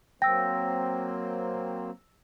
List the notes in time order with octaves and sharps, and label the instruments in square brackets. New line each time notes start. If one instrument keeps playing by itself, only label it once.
[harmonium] F#3 A#3 C4 [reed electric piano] G5 [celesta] E6 A#6